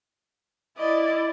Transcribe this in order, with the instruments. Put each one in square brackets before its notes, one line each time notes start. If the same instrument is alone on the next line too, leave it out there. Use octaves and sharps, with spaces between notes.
[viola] E4 D5 [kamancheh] D#5